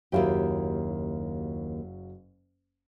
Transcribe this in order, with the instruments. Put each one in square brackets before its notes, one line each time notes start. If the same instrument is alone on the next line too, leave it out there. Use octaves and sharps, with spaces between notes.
[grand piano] F#1 F#3 F5 [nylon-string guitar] D#2 E4 G4